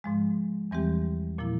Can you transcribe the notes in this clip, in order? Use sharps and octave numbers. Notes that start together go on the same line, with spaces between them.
G#2 F3 G#3
E2 E3 G3 C4 G4
A#2 F3 A#3 E4